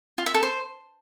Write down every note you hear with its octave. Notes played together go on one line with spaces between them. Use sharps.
F4
E5
A4
C5